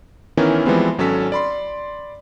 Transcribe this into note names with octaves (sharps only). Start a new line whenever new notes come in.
D#3 E3 B3 C#4 E4 A#4
E3 F3 G3 G#3 B3 C4
G#1 F#3 C#4 A4 B6
D5 B5 C6